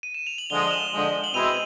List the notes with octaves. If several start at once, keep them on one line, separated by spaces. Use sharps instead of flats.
D#7
E7
F7
F#7
D3 F3 G#3 F7 G7
G7
E7 F#7
D3 F3 G#3
F#7
B2 G#3 C4 E4 D#7 F7